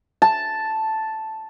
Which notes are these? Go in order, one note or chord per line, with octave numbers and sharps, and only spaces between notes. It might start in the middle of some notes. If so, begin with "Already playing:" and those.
A5